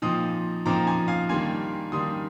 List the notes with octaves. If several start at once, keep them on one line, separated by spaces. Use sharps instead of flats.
A#2 F3 C4 D#4 C6 D#6
A#2 F3 C4 D#4 A#5 D6
G#5 C6
F5 G#5
D#3 G3 A#3 D4 G#5 C6
D#3 G3 A#3 D4 C6 D#6